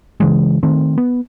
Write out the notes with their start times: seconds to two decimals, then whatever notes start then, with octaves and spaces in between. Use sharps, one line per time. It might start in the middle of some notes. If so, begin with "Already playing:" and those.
0.20 C#3 E3 G#3
0.63 D#3 A3 C4
0.98 B3